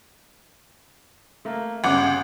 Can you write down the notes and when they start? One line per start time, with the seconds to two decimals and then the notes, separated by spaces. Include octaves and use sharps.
1.45 A3 A#3
1.84 G1 C#3 C#4 F#5 G5 D6